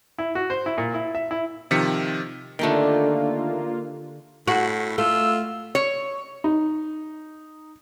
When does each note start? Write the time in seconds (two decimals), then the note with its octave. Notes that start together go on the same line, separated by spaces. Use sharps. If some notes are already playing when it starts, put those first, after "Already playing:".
0.18 E4
0.35 F#4
0.50 C5
0.66 E4
0.78 A#2
0.94 E4
1.15 E5
1.31 E4
1.71 C3 D#3 F3 B6 C#7
2.59 D3 D#3 A3 A#3 F4 G4 G5
4.48 A2 F#4
4.98 A3 F4 E6
5.75 C#5
6.44 D#4